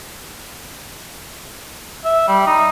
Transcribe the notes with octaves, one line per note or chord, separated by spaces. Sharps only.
E5
G3
D#4